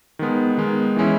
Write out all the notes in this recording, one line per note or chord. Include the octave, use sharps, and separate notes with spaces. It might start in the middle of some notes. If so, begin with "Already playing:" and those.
D#3 G#3 B3
D#3 G#3 B3
E3 G#3 C#4 E4